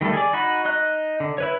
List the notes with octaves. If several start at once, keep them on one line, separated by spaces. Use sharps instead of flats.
D#3 G3 A3 A4
G#4 D5
D#4 F#4 B5
D#4 D#5 F#6
D3
E4 B4 C#5